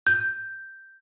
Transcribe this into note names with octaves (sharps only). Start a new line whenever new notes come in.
G6